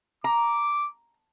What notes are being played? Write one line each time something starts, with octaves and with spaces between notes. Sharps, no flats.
A#5 D6